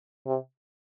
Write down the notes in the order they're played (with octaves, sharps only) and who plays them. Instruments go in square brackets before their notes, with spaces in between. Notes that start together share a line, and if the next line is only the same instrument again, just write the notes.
[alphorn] C3